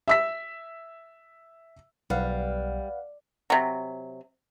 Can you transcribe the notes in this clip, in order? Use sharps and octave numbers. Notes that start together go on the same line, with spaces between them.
E5 E6 B6
B1 G3 B4 F5 F#5
C3 F#3